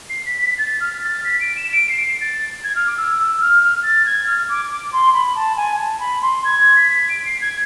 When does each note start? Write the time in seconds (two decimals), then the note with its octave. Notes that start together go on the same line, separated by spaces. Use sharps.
0.09 C7
0.26 B6
0.42 B6
0.58 A6
0.80 F6
1.01 A6
1.24 B6
1.40 D7
1.56 E7
1.72 D7
1.89 C7
2.21 A6
2.64 G#6
2.75 F6
2.87 D6
2.97 E6
3.18 E6
3.41 F6
3.62 F6
3.83 A6
4.06 G#6
4.27 F6
4.49 D6
4.71 D6
4.92 C6
5.13 B5
5.35 A5
5.56 G#5
5.79 A5
6.00 B5
6.22 C6
6.44 G#6
6.76 B6
7.09 D7
7.25 C7
7.41 G#6